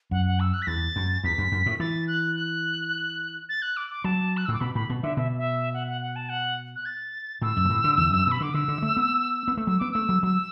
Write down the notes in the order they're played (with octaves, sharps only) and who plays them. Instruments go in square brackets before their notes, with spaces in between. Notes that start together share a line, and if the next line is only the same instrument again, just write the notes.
[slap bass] F#2 [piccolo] F#5
[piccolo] F#5
E6
F#6
B6
[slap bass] E2 [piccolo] A6
[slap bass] F#2
[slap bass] E2 [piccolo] B6
[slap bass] F#2
F#2
A2
[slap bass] E3 [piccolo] A6
[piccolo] F#6
F#6
A6
F#6
D6
D6
[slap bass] F#3 [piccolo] A5
[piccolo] F#6
E6
[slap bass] A2 [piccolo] D6
[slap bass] B2 [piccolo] B5
[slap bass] A2 [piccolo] B5
[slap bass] B2
[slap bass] D3 [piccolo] E5
[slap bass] B2 [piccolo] E5
[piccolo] E5
F#5
F#5
F#5
A5
F#5
F#6
A6
[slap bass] A2 [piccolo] E6
[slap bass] F#2
B2
A2
D3
E2
F#2
[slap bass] B2 [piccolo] B5
[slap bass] D3 [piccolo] D6
[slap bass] D3 [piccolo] E6
[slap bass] D3
A3
B3
B3
A3
[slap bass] F#3 [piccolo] E6
[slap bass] B3 [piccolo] D6
[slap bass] A3 [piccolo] E6
[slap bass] F#3
[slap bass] F#3 [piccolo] E6